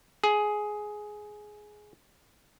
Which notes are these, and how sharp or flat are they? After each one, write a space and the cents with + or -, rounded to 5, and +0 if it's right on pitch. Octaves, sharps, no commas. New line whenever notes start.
G#4 +10